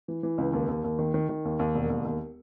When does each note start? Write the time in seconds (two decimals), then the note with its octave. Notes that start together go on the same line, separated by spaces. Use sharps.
0.08 E3
0.23 E3
0.38 C#2
0.53 D#2
0.68 D#2
0.84 D#2
0.99 D#3
1.14 D#3
1.29 D#3
1.45 D#2
1.59 D#2
1.75 E1
1.90 D#2
2.05 D#2